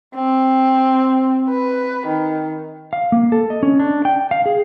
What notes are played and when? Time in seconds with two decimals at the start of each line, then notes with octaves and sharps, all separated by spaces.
0.15 C4
1.49 B4
2.07 D#3
2.93 F5
3.12 A#3
3.32 A4
3.50 D#5
3.63 C#4
3.80 D4
4.05 G5
4.31 F5
4.46 G#4